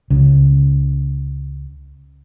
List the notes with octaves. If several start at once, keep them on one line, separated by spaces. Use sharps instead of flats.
C#2 C#3